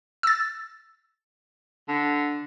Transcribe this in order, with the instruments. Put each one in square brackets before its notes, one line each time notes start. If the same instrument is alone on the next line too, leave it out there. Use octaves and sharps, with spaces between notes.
[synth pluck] E6 A6
[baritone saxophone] D3